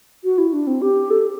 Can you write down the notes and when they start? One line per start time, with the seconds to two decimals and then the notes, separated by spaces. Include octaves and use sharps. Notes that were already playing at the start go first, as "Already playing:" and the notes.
0.24 F#4
0.38 E4
0.53 D4
0.67 C4
0.82 G4
1.10 A4